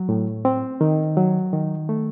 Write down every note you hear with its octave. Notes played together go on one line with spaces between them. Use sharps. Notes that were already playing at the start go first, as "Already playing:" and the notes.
Already playing: F#3
A2
C4
D#3
F#3
D#3
A3